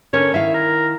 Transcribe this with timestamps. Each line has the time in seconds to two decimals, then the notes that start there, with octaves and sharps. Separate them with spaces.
0.13 D3 C#4 A#4 C#5
0.34 D#3 E4 E5 F5
0.54 A#4